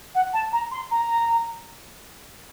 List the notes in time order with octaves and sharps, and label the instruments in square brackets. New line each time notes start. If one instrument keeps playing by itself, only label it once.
[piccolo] F#5
A5
A#5
C6
A#5